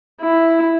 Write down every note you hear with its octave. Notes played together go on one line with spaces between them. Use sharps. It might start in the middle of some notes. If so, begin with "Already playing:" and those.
E4